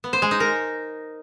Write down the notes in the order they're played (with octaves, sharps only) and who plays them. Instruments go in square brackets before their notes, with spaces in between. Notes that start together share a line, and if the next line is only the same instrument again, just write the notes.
[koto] B3
C5
G#3
D#4
A#4